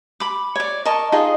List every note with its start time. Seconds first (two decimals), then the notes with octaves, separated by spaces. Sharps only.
0.20 B5 D6
0.56 C#5 D5
0.85 A#4 D#5 A5 C#6
1.12 D#4 F4 G#4 D#5